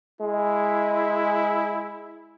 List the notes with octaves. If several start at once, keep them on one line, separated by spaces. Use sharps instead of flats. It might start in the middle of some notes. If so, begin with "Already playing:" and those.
G#3 E4